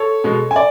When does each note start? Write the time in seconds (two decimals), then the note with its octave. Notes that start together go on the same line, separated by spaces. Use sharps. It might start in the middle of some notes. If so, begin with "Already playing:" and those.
Already playing: A4 C#5
0.24 B2 G#3
0.51 G#5
0.56 D5